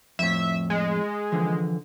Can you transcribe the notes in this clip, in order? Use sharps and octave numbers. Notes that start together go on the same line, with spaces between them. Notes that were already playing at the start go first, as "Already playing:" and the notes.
F2 A2 E5
G#3
D3 E3 F3